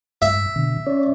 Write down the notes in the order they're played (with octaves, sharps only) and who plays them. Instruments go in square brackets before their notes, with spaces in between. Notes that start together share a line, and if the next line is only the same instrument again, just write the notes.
[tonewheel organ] G2 [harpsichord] E5
[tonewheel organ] B2 D3
C#4 C#5 D5